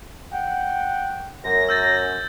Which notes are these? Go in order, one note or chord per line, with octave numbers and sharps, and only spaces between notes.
F#5 G5
F#2 A#6
E6 G6 A6